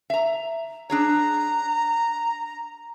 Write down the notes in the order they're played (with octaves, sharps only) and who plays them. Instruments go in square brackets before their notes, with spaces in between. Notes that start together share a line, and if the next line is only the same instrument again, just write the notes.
[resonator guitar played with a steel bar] E5 A#5
[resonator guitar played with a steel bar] D4 G#4 C#5 [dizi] A#5